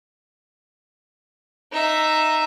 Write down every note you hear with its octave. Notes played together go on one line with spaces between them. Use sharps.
D#4 E5